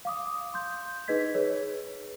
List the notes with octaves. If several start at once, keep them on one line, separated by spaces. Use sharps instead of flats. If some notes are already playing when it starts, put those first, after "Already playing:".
F5 D6 D#6
C6 G6
D#4 G#4 B4 D#5 G#6 B6
G#4 B4 C#5